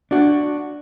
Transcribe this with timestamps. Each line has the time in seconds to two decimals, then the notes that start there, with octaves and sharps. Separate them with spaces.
0.11 D4 F#4